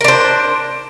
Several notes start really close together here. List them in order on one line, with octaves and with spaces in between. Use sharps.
A#4 D4 C5